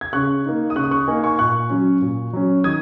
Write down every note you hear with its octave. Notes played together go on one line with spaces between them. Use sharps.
G#6
C#3 C#6 F#6
A#3 D#4
D#6
C#3 C#6 F#6
D#6
C#6 F#6
A#3 D#4 D#5 G#5
G#5 C#6
A#2 C#6 F#6
F#3 C#4
A#2
F#3 C#4
D#3 D#6 G#6